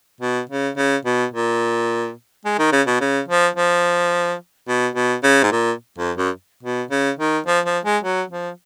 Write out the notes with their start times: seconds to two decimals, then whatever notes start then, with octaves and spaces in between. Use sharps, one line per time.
0.21 B2
0.49 C#3
0.77 C#3
1.05 B2
1.33 A#2
2.45 G#3
2.59 D#3
2.72 C#3
2.87 B2
3.01 C#3
3.28 F3
3.56 F3
4.68 B2
4.95 B2
5.23 C#3
5.43 G#2
5.52 A#2
5.98 F2
6.17 F#2
6.63 B2
6.91 C#3
7.19 D#3
7.47 F3
7.66 F3
7.85 G#3
8.03 F#3
8.30 F3